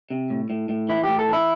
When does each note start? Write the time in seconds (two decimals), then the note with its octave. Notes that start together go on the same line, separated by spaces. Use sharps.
0.10 C3
0.30 A2
0.50 A2
0.69 A2
0.89 E3 E4
1.03 A2 G4
1.19 A4
1.28 E3 E4